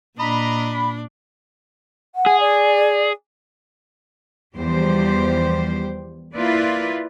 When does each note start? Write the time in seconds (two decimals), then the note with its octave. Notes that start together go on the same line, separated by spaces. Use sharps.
0.19 A#2 D4 D#5 A#5 B5
2.15 F#5
2.26 G#4
2.40 D5
4.55 E2 F3 G3 G4 C5
6.36 A#3 E4 F4 B4 D5